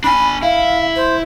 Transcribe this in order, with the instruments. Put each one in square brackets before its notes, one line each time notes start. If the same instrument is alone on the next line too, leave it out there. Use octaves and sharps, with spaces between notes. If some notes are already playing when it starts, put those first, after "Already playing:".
[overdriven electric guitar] D4 G#5 [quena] B5
[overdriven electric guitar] E4 [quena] F5
[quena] C5